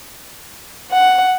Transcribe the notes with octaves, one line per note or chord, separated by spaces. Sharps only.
F#5